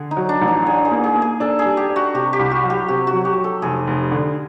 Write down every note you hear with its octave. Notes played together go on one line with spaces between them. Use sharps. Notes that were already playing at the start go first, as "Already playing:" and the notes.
Already playing: D3 G#4
D#4
F#3
D4
A1
D#4
D4 G#4
G#4
A#3
G#4
A#3
G#4
D4 A4
G#4
G3
G4
D4
F#4
C3 G4
G4
C2
F#4
F#3
G4
C3 F#4
F#4
F#3
G4
F#3
A4
F1 G#4
F1
D3